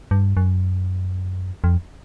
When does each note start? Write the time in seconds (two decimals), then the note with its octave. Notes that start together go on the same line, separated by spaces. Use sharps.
0.11 G2
0.37 F#2
1.64 F2